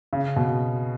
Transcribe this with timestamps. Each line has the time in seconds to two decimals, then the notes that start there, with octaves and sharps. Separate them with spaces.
0.13 C#3
0.36 B2